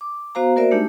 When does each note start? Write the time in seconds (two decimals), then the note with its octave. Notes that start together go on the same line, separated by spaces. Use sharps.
0.01 D6
0.35 B3 F#4 C5 F5 A#5
0.56 A#3 F#4 A#4 C5 D5 E5
0.71 G#3 A3 D4 D#4 G4